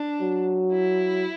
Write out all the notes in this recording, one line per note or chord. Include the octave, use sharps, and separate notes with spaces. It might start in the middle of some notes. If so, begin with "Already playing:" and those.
Already playing: D4
F#3
E4